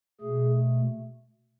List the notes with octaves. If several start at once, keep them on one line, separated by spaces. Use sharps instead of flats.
B2 A3 G#4